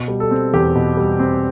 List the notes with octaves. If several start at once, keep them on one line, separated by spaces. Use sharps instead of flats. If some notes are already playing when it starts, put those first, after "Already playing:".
Already playing: B2
G3
A4
C4
E2 G4
B2
G3
C4